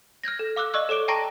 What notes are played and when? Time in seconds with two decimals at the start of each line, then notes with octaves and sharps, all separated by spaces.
0.24 F6 G6 G#6 A#6
0.39 A4
0.56 F5 D6 E6 F#6
0.74 D5 D#5 C#6 E6 F#6
0.89 A4 C#5 D6 D7 G7
1.08 G5 A5 A#5 C#6 A#6 D7